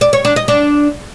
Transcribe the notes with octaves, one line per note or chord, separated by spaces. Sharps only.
D5
C#5
D4
D#5
D4